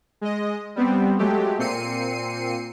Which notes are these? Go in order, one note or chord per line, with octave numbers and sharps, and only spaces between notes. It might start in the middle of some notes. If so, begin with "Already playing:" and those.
G#3 D#5
G3 B3 C4
F#3 G#3 A3 G4
A#2 C4 C7 C#7 D#7